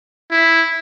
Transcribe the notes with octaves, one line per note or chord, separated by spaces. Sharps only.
E4